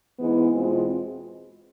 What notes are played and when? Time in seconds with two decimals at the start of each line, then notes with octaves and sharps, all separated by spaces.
0.20 G#2 E3 G#3 B3 E4
0.55 E2 B2 G#3 C4 F4